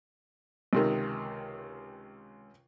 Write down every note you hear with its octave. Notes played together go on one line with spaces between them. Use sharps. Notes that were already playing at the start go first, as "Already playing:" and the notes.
C#2 C3 D#3